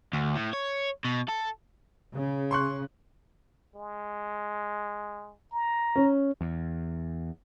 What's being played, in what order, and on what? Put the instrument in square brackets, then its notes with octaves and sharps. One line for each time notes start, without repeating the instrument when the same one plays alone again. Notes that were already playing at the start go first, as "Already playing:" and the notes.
[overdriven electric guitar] D2
A2
C#5
B2
A4
[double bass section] C#3
[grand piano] C6 C#6 F#6
[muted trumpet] G#3
A#5
[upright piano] C#4
[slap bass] E2